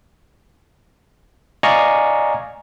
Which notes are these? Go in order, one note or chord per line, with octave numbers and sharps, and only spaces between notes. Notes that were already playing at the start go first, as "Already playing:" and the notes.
D5 D#5 F5 G#5 A#5 C#6